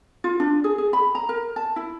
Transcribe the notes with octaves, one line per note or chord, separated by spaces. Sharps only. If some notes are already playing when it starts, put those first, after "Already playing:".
F4
D4
G#4
G#4
B5
A#5
A#4
A5
E4